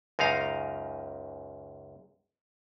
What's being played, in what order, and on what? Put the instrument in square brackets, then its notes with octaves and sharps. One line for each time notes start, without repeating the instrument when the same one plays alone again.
[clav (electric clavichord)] C#2 F#2 D#4 F5 A#5